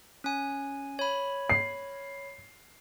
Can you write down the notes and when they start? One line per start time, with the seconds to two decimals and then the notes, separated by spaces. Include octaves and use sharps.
0.24 C#4 G#5
0.99 C#5 B5
1.50 C7